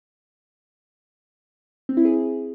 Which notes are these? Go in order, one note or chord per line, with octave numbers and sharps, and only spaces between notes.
C4
E4
G#4